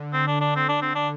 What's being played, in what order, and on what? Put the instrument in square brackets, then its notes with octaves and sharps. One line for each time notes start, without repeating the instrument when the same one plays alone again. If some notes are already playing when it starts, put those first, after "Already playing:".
Already playing: [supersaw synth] D3
[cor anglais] C4
D4
D4
C4
D4
C4
D4